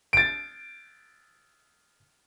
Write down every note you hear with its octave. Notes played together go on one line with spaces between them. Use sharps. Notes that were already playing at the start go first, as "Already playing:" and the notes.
A6 D7